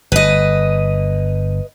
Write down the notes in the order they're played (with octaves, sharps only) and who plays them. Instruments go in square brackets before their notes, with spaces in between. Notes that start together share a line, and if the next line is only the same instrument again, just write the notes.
[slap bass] G1 [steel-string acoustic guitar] B4 D#5